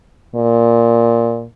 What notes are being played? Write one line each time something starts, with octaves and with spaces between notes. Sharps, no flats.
A#2